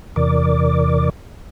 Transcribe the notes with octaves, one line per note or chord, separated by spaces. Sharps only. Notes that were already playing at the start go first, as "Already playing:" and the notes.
E2 C3 E3 A#4 D5 D6